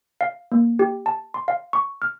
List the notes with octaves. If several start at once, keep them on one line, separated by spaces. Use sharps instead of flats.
F5
A#3
G4
A5
C6
F5
C#6
F6